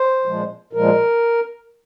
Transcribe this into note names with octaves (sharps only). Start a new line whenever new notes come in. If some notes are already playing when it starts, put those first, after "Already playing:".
Already playing: C5
A#2 F3 G#3
A#2 F3 G#3 A#4